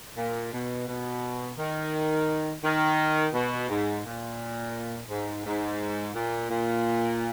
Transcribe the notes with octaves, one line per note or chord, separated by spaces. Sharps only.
A#2
B2
B2
D#3
D#3
B2
G#2
A#2
G#2
G#2
A#2
A#2